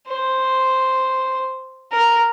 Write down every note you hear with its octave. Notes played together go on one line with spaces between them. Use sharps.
C5
A#4